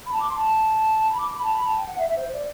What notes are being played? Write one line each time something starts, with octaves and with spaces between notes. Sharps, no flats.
B5
A5
D6
C6
A5
B5
D6
B5
A5
B5
A5
G5
F#5
E5
E5
C5
D5